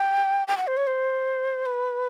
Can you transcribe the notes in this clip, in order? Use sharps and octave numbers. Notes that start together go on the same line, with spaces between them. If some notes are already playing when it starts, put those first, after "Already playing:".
Already playing: G5
G5
F#5
C5
C#5
C5
B4